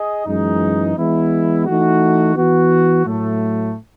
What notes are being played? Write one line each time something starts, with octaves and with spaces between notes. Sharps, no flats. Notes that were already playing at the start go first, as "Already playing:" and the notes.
Already playing: G#4 D#5
F#2 E3 G#3 D#4
E3 G#3 B3 E4
E3 A3 D#4 F#4
E3 B3 F#4
A2 F#3 A3